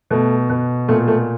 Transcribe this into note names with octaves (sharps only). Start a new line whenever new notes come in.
B2 A3
B2
A#2 A3
A3